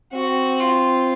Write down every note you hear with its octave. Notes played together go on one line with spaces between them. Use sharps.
C4 F#4
F4